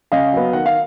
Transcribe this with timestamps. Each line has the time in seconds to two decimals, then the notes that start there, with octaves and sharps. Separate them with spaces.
0.12 C#3 D#5 F5
0.33 F#3 B3
0.53 D#3 F#5
0.66 F5